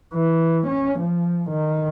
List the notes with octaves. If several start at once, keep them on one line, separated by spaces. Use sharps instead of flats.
E3
C#4
F3
D#3